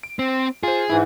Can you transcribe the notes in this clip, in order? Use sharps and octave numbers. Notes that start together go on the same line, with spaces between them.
D7
C4
F4 G#4 C5
G#2 E3 E4